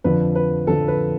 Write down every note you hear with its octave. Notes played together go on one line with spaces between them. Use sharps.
F2 D3 F3 B4
B4
F2 D3 F3 A4
B4